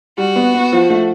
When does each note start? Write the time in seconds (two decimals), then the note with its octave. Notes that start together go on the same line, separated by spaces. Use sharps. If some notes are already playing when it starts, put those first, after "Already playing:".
0.18 G3 F#4
0.36 B3
0.55 B3
0.73 F3
0.90 A3